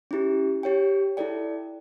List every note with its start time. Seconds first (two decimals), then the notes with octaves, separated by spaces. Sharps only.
0.11 C#4 E4 G4
0.63 G4 C#5 G5
1.17 E4 A4 D5 G5